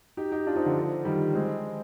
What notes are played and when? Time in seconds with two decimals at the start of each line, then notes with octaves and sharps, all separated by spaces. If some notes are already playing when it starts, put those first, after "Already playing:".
0.17 D#4 G4
0.32 D#4 G4
0.46 D4 F4
0.56 C4 D#4
0.66 D3 F3
1.05 D#3 G3
1.34 G#3 C4